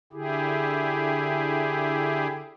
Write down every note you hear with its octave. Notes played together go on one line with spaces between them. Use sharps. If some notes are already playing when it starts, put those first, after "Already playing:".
D3 E4 G4 G#4